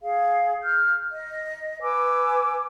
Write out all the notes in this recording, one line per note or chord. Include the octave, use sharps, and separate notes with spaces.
G#4 F5
F6 G6
D#5
B4 G#5 D6 E6